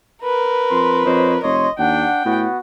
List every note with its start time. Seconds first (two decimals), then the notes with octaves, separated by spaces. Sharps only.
0.23 A#4 B4
0.71 F2 C6
1.06 F2 C5 C#5 D#5
1.43 F1 C#5 D#5 C6
1.79 D#2 D4 F#5 G5
2.25 A2 B3 F#4